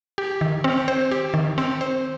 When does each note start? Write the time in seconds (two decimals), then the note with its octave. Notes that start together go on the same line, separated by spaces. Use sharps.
0.18 G4
0.41 D#3
0.64 C4
0.88 C5
1.11 G4
1.34 D#3
1.58 C4
1.81 C5